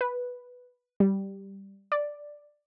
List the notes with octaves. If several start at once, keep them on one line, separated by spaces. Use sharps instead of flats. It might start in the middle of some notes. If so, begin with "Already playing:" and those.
B4
G3
D5